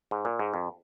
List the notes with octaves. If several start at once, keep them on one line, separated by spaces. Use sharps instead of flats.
G#2
A#2
G#2
F2